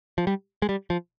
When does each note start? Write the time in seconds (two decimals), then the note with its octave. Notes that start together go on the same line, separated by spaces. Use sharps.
0.18 F3
0.27 G3
0.62 G#3
0.69 G3
0.90 F3